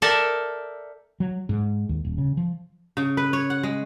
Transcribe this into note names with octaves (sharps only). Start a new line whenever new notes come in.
A4 A#4 D5 E5 G5
F#3
G#2
D#2
D#1
C#3
F3
C#3
B4
C#5
F#5
G#3